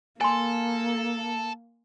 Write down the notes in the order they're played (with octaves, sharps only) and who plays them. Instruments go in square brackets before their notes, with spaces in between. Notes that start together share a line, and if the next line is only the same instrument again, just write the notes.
[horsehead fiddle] A#3 [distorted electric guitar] A4 [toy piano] G#5 C6